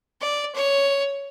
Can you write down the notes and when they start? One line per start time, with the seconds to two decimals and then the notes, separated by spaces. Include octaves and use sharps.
0.21 D5
0.55 C#5